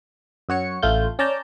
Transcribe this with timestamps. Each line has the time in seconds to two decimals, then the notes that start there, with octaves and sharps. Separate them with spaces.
0.49 F#2 F#4 C#5 C#7
0.82 A1 A3 F4 G6
1.19 C#4 D5 A5 A#5 G6